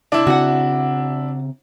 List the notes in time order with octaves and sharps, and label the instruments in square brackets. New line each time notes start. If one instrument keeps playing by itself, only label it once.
[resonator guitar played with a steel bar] C3 [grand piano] D4 E4
[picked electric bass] C#3 C4 [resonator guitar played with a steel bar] F#4 F#5